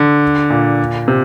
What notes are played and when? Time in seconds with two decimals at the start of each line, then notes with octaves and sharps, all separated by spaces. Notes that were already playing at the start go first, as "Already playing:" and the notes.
Already playing: D3
0.50 A#2
1.08 C3